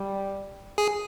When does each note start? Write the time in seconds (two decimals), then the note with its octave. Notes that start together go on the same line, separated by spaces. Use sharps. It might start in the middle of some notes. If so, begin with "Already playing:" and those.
Already playing: G3
0.78 G#4